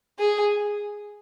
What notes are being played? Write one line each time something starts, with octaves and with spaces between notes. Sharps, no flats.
G#4